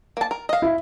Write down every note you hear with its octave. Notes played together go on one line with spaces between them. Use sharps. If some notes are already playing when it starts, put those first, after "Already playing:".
A#3 A5
A#4
D#5 F5
E4